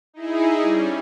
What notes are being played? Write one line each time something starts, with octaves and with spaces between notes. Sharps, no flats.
D#4 E4 G#4
G3 C#4